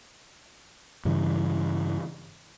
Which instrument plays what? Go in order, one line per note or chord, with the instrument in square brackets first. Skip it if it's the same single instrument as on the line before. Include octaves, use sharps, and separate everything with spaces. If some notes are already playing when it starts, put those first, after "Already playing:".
[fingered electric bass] G2 C#3 E3